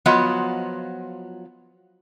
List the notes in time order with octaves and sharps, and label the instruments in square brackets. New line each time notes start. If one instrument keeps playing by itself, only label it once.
[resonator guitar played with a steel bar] F3 F#3 B3 F4 D#5